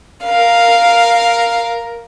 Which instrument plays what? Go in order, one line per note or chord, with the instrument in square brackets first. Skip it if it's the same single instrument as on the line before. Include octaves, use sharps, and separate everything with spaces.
[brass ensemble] A#4 [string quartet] F5